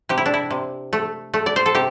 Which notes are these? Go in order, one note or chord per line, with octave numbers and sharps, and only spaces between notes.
C3 G4
E4
D4
E4
C3
A3
A3
D5
C5
A4
C3 G4